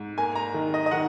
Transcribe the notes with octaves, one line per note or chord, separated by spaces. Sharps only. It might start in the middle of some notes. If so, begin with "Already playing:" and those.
Already playing: G#2
A#3 G#5
A#5
D#3
D#5
D#5
D#3 F#5